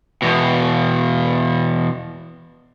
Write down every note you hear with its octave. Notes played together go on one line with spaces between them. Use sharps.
E2 B2